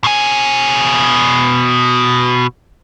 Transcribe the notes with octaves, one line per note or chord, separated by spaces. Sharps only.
B2 G#5